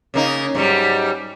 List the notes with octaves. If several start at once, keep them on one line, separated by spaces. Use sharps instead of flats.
C#3 A#3 D#4
G#2 F#3 G3